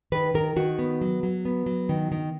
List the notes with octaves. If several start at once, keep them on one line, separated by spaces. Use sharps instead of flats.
D#3 B4
D#3 A#4
D#3 F#4
B3
F#3
F#3
B3
F#3
D#3
D#3